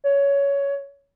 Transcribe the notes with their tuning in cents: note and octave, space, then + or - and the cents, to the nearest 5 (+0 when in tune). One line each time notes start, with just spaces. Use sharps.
C#5 +15